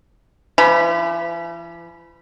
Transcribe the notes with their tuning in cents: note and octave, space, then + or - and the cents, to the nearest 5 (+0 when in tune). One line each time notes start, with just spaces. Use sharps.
E3 +45 B5 -15